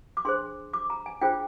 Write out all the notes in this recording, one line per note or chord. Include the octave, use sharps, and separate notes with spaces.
D6
D4 G#4 C5 C6
D6
A#5
G#5
D4 F4 G#4 C5 G5